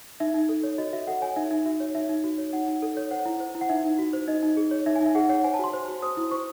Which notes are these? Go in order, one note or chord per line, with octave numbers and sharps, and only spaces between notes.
D#4 E5
D#4
A4
C#5
F#4 D#5
F#4 E5
A4 F#5
C#5 G#5
D#4 E5
D#4 E5
F#4 E5
C#5
D#4 E5
D#4
F#4
C#5
D#4 F#5
D#4
A4
C#5
C5 F#5
E4
C5
E4
F#5
D#4 E5
D#4
F#4
C5
D#4 D#5
D#4
G#4
C#5
D#4 E5
G#5
D#4 E5
G#4 F#5
C#5 F#5
C5 G#5
A5
F#4 C6
C5
F#4
C5 D#6
E4
C5 C#6